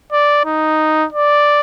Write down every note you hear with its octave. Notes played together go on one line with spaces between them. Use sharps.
D5
D#4
D5